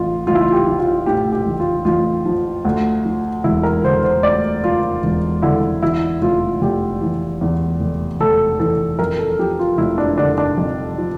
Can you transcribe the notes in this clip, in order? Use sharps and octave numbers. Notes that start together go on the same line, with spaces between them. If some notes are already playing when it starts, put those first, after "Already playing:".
Already playing: A1 A2 F4
A1 F4
E4
F4
G4
F3
F4
A2 G4
G4
A1
F4
A1 F4
F3
D2
F3
E1 E4
A#4
D3 C5
C5
D2 D5
F3 F4
E1
D3 E4
E2 E4
F1 F4
F1 G4
E3
E2
F1
F1 A4
E3 A4
F2 A#4
A4
F3 G4
F4
F1 E4
D4
D3 D4
D4
F2
F3